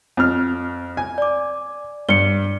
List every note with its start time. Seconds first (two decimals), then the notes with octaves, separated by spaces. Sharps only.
0.17 F2 F6
0.97 G#5
1.18 D5 D6
2.09 G2 C#7 G7